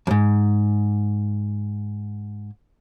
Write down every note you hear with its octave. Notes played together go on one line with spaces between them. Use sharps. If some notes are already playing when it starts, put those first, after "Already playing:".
F2 G#2